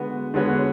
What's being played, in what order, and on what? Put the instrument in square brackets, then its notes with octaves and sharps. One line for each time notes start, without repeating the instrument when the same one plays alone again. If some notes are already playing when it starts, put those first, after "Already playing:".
Already playing: [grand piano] D3 G#3 B3 F#4
D3 G#3 B3 F#4 C#5